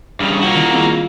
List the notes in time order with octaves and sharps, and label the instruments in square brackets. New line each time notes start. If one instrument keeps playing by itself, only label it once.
[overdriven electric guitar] G2 C#3
[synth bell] G3 F4 G6 [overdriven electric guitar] A#3 F#4
[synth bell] D#3 E4
C4 F4 G#4